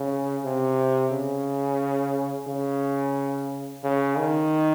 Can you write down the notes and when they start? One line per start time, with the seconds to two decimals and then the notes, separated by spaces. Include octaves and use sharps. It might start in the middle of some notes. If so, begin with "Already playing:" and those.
Already playing: C#3
0.45 C3
1.11 C#3
2.47 C#3
3.83 C#3
4.17 D#3